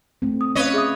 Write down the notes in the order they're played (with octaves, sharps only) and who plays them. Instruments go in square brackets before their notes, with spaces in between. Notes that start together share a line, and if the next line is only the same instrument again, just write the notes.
[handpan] A3 C4
[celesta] D#6
[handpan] C#4 F5 [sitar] B4 C#5 D#5
[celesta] G#4 E5 D#6